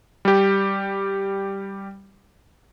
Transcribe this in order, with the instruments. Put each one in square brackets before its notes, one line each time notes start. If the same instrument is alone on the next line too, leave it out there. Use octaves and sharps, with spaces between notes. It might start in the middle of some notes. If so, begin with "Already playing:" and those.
[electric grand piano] G3 G4